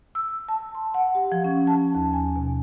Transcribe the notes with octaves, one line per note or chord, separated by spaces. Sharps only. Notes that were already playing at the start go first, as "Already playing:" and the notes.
E6
A5
C6
F#5
G4
F3
C#4
A5
D#2
G#5
B2